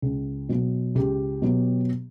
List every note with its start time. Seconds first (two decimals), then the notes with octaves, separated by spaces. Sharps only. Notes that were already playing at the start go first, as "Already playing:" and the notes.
0.02 C#2
0.49 B2 F#3 B3
0.95 C#2 G4
1.42 B2 F#3 B3